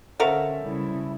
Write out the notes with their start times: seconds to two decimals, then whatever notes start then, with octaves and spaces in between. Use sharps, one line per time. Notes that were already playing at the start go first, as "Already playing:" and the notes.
0.20 D3 C#4 F#4 A4 A#4 C5 E5 F5
0.63 C#3 G3 E4